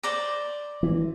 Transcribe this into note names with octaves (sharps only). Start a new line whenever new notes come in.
C5 D5 A#5
E3